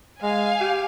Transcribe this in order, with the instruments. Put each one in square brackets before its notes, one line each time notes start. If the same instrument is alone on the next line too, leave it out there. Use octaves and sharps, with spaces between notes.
[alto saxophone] G#3 [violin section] F5 G#5
[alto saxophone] G4